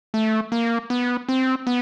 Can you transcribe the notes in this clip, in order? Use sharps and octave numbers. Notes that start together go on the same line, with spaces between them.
A3
A#3
B3
C4
B3